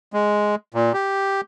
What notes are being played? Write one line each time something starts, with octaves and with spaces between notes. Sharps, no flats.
G#3
A#2
G4